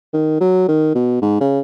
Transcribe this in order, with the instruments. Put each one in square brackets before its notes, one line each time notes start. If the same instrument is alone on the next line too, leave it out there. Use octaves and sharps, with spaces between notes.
[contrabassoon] D#3
F#3
D#3
B2
G#2
C#3